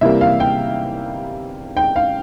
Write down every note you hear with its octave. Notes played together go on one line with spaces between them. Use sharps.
C3 E3 G3 A#3 E5
F5
G5
G5
F5